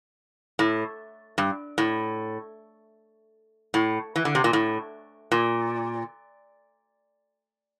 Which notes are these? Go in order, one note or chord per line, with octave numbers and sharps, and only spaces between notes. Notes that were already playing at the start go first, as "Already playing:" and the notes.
A2
G2
A2
A2
E3
D3
C3
A#2
A2
A#2